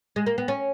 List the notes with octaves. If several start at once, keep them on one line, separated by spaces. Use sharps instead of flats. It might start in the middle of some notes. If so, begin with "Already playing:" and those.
G#3
A#3
B3
C#4